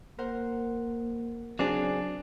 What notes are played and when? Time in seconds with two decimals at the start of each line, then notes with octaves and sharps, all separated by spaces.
0.18 A#3 A#4 C5 F#5
1.59 C#3 F#3 C4 D4 G#4